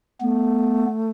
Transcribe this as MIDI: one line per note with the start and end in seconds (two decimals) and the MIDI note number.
0.21 1.11 57
0.21 0.86 59